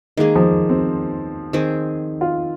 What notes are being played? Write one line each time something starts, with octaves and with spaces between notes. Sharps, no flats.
D#3 G#3 A#3 G#4
F3
C4
D#3 C4 G#4
F4